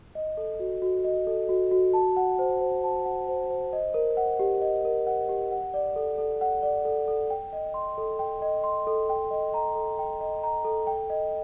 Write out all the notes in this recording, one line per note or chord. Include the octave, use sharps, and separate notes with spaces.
D#5
A4
F#4
F#4
D#5
A4
F#4
F#4
A5
F#5
C5
C5
A5
F#5
C5
C5
D#5
A#4
F#5
G4
D#5
A#4
F#5
G4
F#5
D5
A4
A4
F#5
D5
A4
A4
G5
D#5
C6
A4
G5
D#5
C6
A4
G5
D#5
A#5
A4
G5
D#5
A#5
A4
G5
D#5